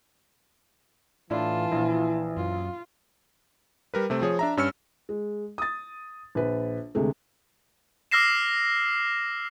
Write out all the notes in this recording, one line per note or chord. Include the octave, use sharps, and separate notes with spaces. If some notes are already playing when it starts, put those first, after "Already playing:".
A2 E3 D4 E4 F4 A5
A#1 E4
F#2 F4
G3 A#4 B4
C3 A3 C4
F3 G#4 C#5
D4 E5 A#5
G2 C#4 E6 F6 C#7
G#3
D#6 A6
A#1 B4
D2 C3 G#3 A3
D6 E6 F6 A#6 C7 E7